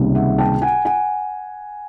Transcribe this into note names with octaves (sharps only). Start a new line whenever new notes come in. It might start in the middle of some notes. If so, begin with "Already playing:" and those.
Already playing: C#2 C3 D#3 G3 A#3
E5 F#5
G5 A5
F#5 G#5
F#5 G#5